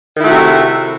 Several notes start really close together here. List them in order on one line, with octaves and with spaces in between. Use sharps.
D#3 E4 A3 F#4 C3